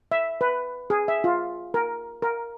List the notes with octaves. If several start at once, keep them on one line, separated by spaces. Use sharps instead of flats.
E5
B4
G#4
E5
F4
A#4
A#4